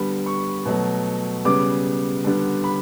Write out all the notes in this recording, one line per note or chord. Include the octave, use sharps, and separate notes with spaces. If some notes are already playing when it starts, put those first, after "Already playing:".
Already playing: D3 G3 B3 B5
C#6
B2 F#3 A3
C#3 G3 B3 D6
D3 G3 B3
B5